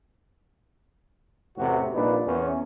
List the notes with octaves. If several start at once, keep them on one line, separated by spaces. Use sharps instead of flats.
A1 E2 A2 C3 F#4
A#1 G2 A#2 D4 D#4 B4
E2 C#4